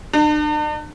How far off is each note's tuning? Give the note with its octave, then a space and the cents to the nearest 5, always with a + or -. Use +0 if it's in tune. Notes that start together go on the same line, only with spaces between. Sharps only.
D4 +45